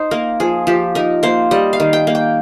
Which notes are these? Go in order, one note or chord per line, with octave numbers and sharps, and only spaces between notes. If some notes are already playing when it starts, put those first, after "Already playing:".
Already playing: D#4 C5
A#3 A#4
F3 G#4
F3 G4
D#4 A#4
A#3 C5
G3 D#5
F5
D#3
G5
A#3
G5